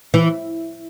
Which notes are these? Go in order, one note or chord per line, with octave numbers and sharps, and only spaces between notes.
E3